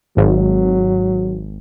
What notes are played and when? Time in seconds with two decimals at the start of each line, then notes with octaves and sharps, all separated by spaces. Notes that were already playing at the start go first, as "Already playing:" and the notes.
0.17 G#1 F#3